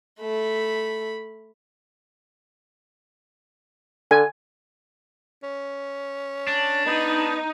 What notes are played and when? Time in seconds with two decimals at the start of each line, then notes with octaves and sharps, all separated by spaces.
0.20 A3 B5
4.11 D3 G#5
5.43 C#4
6.47 D4
6.86 B3 D#4